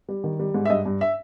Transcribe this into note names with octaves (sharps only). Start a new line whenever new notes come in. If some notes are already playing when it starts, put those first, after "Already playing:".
G3
D#3
G3
G#2
E5
G2 D#5
G2
E5